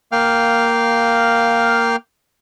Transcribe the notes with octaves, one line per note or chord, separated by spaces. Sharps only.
A#3 F5 G5 F6